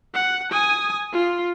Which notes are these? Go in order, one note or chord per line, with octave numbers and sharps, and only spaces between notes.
F#5
G#5 D#6
F4